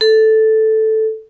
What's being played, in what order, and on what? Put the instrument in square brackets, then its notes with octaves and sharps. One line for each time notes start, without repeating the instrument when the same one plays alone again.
[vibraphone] A4